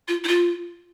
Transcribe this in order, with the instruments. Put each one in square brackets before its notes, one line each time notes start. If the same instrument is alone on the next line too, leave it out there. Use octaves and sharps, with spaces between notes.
[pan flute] F4
E4
F4